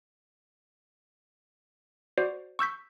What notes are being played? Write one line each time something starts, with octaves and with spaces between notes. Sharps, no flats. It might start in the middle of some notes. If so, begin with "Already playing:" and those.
F#4 C5 D5
C#6 E6 G6 B6